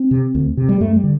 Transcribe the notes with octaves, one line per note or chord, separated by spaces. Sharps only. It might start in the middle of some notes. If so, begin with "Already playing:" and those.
Already playing: C4
C3
D2
C3
G3
F#2 A3
G3
D3